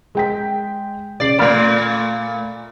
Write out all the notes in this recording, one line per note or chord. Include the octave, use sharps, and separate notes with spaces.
G#3 G5 B6
C#3 D5 C7
A#2 A3 D5 B5 F6